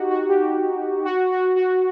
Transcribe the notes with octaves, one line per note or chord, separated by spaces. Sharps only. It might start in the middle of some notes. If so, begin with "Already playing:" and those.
Already playing: D#4 F#4 G4
F#4
G4
F#4
F#4
F#4